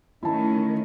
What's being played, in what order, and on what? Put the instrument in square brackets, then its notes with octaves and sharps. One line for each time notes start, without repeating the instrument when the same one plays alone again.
[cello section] D#3 A3 C#4 [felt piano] E4 A5